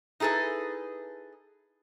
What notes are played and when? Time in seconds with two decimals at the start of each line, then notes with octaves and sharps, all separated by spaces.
0.20 D#4 E4 G#4 A4 B4